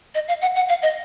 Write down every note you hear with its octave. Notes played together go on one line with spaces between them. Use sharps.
D#5
F5
F#5
F#5
F5
D#5